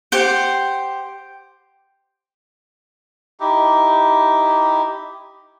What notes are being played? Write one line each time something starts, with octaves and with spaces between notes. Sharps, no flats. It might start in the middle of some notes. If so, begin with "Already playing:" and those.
G4 C5 F#5
D#4 E4 G4